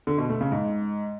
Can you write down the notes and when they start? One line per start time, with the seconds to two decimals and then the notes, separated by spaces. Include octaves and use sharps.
0.07 D3
0.18 B2
0.29 A3
0.41 C#3
0.52 G#2